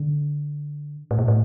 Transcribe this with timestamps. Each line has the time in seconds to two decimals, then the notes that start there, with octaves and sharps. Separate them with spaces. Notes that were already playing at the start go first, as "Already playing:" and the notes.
Already playing: D3
1.11 A2
1.19 A#2
1.28 A2